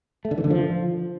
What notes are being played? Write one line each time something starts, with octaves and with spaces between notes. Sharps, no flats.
A3
D3
E3
D3
F3